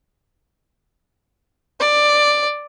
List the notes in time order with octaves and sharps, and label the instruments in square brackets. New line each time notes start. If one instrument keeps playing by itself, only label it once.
[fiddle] D5